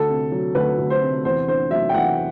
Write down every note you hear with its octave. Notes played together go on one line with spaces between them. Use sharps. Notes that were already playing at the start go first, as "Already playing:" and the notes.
Already playing: D2 A4
C3
F#3
D2 B4
D2
C5
C3
E2 C5
D3 C5
F#3 E5
G5
E2 F#5